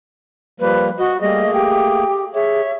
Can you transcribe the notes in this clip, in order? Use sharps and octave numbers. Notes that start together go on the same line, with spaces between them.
F3 G3 A#3 B4
F#4 D#5
G3 A3 A#3 G#4 D#5
G4 G5
G#4 C#5 E5